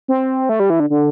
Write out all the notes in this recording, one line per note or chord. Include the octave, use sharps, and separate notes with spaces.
C4
A3
G3
E3
D3
D3